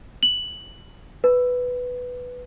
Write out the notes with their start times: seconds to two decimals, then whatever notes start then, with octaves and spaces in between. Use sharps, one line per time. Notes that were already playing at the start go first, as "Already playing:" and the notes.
0.23 F#7
1.24 B4